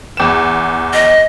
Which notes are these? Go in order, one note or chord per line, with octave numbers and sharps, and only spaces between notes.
E2 E7
D#5